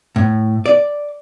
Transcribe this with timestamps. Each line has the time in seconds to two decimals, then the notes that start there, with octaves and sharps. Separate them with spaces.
0.16 A2
0.66 D5